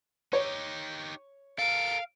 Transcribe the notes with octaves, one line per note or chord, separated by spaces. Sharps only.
D#4 G4 C#5
A4 A#4 F5 D7